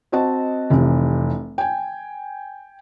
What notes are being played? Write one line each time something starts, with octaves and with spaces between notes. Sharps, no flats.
C4 F#4 D#5 A5
F1 C3 E3
G5 G#5